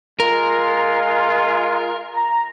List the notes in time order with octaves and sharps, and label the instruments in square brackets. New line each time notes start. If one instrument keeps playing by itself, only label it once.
[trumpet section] G#3 F4 [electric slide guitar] A#4
[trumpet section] A#5